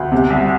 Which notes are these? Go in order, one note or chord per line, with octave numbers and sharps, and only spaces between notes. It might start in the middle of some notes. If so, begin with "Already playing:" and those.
Already playing: D2
C3
C2